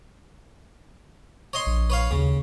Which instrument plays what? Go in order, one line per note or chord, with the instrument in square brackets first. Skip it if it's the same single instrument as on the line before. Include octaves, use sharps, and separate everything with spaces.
[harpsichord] C#5 D#5 C6
[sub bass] A#1
[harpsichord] B4 C#5 F5
[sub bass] D#2 [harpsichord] C#3